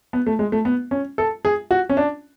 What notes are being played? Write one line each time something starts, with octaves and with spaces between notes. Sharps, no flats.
B3
A3
G#3
A3
B3
C#4
A4
G#4
F#4
C#4
D4